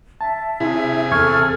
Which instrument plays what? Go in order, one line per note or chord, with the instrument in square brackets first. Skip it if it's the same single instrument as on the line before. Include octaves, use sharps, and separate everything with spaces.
[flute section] E5 [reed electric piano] A5
[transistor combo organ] C3 G#4 [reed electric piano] E4
[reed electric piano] E2 C#6 G#6 [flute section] A4 F6